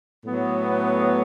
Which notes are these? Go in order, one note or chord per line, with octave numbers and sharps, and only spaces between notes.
A2 F#3 B3